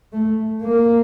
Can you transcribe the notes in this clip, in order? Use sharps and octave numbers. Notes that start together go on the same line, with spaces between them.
A3
A#3